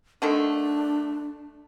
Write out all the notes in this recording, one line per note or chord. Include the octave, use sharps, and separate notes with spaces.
D3 D#3 A3 D4